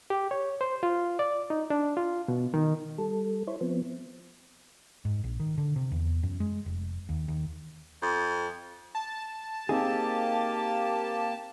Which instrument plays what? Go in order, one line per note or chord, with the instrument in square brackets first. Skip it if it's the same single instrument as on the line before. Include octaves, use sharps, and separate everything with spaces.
[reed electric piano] G4
C#5
C5
F4
D5
D#4
D4
F4
B2
D#3
[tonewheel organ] G3 A4
E4 C5 C#5
F3 B3 C4
[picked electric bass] G#2
A#1
D#3
D3
C3
E2
F#2
G#3
F1
D#2
D#2
[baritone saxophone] F2
[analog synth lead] A5
[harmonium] A#3 G4 [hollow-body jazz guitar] C4 D#4 G#4